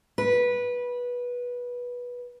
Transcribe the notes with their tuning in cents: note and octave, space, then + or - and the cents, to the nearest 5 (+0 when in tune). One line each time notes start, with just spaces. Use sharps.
B4 -15